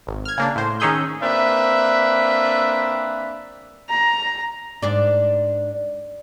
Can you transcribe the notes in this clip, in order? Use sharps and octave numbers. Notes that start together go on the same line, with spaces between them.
G#1
F6 G#6
C#3 A#3 D4
A2 C5
D#3 C#4 D#4 G#4 E6 G6
A#3 C4 D4 B4 E5
A#5
G#2 D4 D5